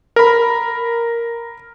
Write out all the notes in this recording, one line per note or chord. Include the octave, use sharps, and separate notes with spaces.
A#4 B5